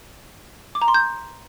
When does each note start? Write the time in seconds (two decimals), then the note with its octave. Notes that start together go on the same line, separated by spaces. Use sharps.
0.75 D6
0.82 A#5
0.88 C6
0.94 G6